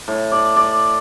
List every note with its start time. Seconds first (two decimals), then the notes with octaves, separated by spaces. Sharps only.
0.08 A2
0.32 D5
0.56 D5